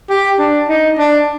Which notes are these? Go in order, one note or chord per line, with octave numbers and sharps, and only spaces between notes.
G4
D4
D#4
D4